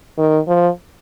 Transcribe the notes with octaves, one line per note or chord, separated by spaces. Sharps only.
D#3
F3